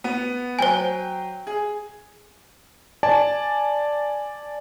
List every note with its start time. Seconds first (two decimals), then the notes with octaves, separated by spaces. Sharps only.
0.04 B3
0.59 F#3 C5 G5 G#5
1.47 G#4
3.03 D5 G#5 A5